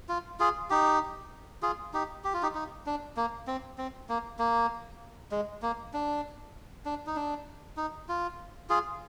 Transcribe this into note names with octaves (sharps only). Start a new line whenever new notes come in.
F4
F4 G#4
D#4 G4
F4 G#4
D#4 G4
G4
F4
D#4 G4
D#4
D4
A#3
C4
C4
A#3
A#3
G#3
A#3
D4
D4
D#4
D4
D#4
F4
F4 G#4